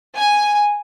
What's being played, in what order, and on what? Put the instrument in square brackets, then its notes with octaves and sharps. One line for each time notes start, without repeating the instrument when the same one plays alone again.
[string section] G#5